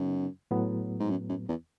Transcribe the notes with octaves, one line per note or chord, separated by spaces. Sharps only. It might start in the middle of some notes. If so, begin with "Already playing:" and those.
Already playing: F#2 C#3 B3 D#4
A2 F#3 B3
G#2
F#2
F#2
E2